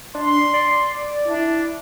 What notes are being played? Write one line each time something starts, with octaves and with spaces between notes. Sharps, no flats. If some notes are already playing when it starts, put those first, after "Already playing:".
D4 C6
D5
D4 E4